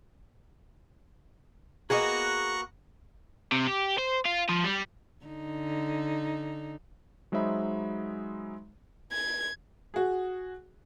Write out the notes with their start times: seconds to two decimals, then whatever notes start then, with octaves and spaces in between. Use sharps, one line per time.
1.90 A#3 B3 F#4 G#4 D#5 A#5 C#6 F#6
3.52 C3
3.67 G4
3.98 C5
4.25 F4
4.49 F3
4.64 G3
5.25 D3 D#4
7.32 F#3 G#3 D#4 C5 E5 B5
9.12 G#6
9.94 F#4 G#4